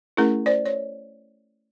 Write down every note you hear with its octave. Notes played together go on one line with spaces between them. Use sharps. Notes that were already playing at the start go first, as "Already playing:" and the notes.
A3 C#4 E4 G#4 A#4
C5 D5
C#5